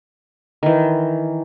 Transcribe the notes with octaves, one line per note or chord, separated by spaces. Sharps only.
D#3 E3